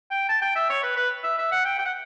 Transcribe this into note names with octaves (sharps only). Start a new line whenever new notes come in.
G5
A5
G5
E5
C#5
B4
B4
E5
E5
F#5
G5
G5
F#5